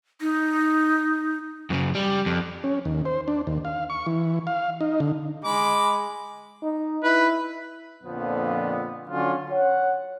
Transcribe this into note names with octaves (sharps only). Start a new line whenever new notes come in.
D#4
F#2 C#3
G3
F2
C#4
D#2
C5
D4
D#2
F5
C#6
E3
F5
D#4
D3
G#3 B5 D6
D#4
E4 B4
F2 A#2 D3 F3 B3
D3 F#3 C#4 D4 F4
C#5 F#5